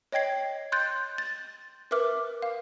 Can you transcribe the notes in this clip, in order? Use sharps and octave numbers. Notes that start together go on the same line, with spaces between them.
C#5 D#5 G5 G#6 C7
C6 F#6 G6 A6
A6
A#4 B4 E5 D6 F6
F5